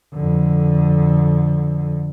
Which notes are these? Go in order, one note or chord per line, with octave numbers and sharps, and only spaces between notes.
F2 D3